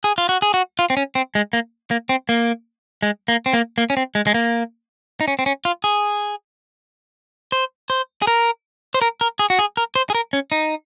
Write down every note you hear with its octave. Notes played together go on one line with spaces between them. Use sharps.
G#4
F4
F#4
G#4
F#4
F4
C4
C#4
C4
G#3
A#3
A#3
C4
A#3
G#3
A#3
C4
A#3
A#3
C#4
C4
G#3
G#3
A#3
D#4
C#4
C4
C#4
F4
G#4
C5
C5
G#4
A#4
C5
A#4
A#4
G#4
F#4
G#4
A#4
C5
G#4
A#4
C#4
D#4